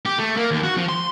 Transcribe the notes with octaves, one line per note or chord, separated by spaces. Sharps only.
G4
A3
A#3
D#2
F#4
F3
C6